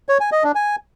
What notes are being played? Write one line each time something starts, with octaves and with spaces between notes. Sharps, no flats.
C#5
G#5
D#5
D4
G#5